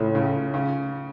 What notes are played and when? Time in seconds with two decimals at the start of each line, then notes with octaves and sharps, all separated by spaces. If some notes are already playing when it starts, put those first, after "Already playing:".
Already playing: C#2 A2
0.15 C#3
0.54 C#3